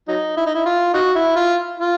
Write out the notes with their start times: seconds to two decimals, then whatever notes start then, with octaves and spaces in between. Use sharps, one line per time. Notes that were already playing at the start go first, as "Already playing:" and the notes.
0.08 F#3 D#4
0.37 E4
0.46 D#4
0.54 E4
0.65 F4
0.93 D#4 F#4
1.15 E4
1.36 F4
1.80 F4